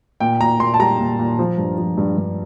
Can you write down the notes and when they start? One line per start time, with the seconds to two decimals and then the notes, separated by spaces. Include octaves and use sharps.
0.20 A#2 G5
0.40 A#2 A#5
0.60 A#2 C6
0.74 A5
0.79 G3 A#5
0.99 A#2
1.19 A#2
1.39 F3
1.58 G2
1.78 F3
1.97 G2
2.18 G2